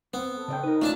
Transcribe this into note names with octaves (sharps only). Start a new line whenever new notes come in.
B3 C4
A4
C#3 D5 G5
D#4 A#4 B4
A3 C#4 D4 F4 A5